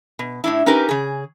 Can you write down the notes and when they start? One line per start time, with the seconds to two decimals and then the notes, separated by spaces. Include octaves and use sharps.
0.19 B2
0.44 A2 D4 E4
0.66 C#4 D#4 G4 A#4 B4
0.89 C#3 G#4